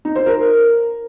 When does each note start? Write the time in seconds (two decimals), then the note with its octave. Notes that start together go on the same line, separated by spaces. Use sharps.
0.05 D#4
0.16 C5
0.26 A#4